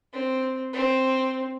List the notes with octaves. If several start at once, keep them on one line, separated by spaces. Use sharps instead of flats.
C4
C4